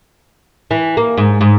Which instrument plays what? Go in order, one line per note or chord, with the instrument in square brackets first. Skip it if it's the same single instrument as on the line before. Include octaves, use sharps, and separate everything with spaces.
[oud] E3
A#3
G#2
G#2